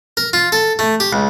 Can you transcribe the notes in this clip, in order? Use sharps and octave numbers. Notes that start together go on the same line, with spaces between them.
A#4
F4
A4
A3
G4
C#2